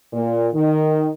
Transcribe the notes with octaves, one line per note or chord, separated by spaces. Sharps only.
A#2
D#3